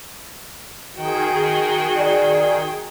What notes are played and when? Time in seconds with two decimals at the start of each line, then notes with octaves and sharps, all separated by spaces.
0.97 D#3 F#4 G#4 G5
1.97 D5